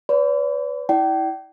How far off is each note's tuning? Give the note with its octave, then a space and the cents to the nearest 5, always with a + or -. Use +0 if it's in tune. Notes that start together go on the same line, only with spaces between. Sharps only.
B4 +20 D5 -45 B5 +40
E4 -20 D5 +0 G5 -35